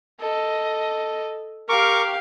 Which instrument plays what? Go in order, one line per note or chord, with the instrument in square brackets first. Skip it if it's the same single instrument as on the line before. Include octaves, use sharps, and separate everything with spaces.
[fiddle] A4 D#5
[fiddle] G4 F5 [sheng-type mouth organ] A#4 C#6 D6